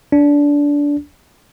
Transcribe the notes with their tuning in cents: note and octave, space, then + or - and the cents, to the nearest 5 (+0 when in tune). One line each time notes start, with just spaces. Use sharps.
D4 -20